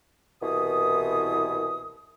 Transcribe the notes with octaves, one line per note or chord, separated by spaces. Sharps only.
C2 B2 E3 D#6